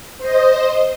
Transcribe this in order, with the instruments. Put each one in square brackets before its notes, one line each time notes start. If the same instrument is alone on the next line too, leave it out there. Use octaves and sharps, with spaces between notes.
[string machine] C5 D#5